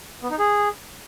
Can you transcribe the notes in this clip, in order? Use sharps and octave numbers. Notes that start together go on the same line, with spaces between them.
B3
D#4
G#4